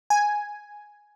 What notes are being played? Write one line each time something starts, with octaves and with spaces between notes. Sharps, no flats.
G#5